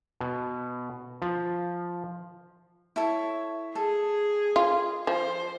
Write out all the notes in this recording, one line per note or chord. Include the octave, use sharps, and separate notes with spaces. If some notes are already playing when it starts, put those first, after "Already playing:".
B2
F3
E4 A4 C#5
G#4 A4
F4
F3 C5